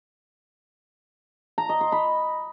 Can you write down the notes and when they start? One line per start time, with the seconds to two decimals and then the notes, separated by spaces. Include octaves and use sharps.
1.58 A#5
1.69 D#5
1.81 C6
1.92 B5